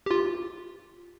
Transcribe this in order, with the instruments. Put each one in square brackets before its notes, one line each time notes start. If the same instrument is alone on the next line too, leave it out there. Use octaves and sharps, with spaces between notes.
[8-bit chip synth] F4 G4